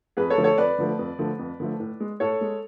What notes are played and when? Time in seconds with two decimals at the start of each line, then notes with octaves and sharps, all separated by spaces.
0.17 F2 G#4 B4
0.30 A4 C#5
0.38 D3 F3 A3
0.44 A4 C#5
0.58 F2 B4 D5
0.78 D3 F3 A3
0.99 F2
1.19 D3 F3 A3
1.39 F2
1.60 D3 F3 A3
1.80 A2
2.00 G#3
2.20 A2 A4 C#5
2.41 G#3